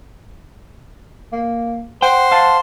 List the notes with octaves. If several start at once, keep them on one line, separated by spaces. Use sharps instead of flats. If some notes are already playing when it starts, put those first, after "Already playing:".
A#3
C5 F#5 G5
F5 A5